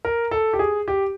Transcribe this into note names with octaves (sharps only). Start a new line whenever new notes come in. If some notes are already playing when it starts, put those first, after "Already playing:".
A#4
A4
G4
G#4
G4